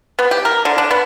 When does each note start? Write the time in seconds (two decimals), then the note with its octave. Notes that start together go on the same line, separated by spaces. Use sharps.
0.19 B3
0.31 G4
0.45 A#4
0.65 D3
0.78 D4
0.91 B3